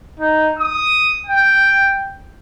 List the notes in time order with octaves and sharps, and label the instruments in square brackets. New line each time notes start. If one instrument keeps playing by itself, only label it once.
[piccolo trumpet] D#4
D#6
G5